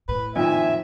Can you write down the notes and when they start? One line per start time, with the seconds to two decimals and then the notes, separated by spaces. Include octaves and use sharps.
0.09 A2 B4
0.36 F2 A#2 D#3 E5 G#5